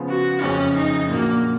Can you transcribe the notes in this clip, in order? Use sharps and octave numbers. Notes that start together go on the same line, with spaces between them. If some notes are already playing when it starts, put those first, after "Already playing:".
Already playing: C#3 F3 B3 F4
F#4
F#1 F2 C#3 C#4
D#4
A#1 A#2 F#3 A#3